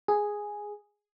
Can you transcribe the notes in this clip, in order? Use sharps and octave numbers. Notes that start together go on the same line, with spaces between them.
G#4